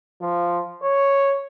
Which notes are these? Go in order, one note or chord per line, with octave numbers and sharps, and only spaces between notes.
F3
C#5